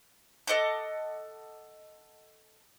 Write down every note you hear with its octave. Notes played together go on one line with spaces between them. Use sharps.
A4 D#5 F#5 D6